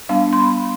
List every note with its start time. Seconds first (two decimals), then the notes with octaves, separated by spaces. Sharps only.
0.09 G3 B3 D4 F5
0.33 C6
0.40 B5